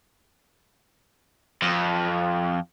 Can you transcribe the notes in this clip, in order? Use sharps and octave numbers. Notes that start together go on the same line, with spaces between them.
F2